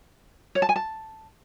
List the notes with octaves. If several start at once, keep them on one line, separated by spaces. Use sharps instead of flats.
C#5
A5
G#5
A5